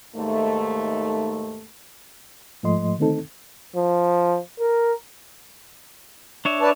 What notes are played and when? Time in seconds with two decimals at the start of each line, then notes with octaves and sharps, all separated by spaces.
0.16 D#2 G#2 A3
2.63 G#2 F3 A3 D#5 C6
2.98 D3 D#3 A3 C4 D#4 A4
3.76 F3
4.60 A#4
6.45 D4 C#5 E5
6.61 B4 D5 A5